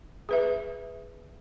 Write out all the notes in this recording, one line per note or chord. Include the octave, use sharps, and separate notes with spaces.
G#4 B4 E5